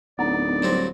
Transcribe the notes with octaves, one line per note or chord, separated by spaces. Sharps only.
D1 B3 D#4 D5
G2 F#3 C4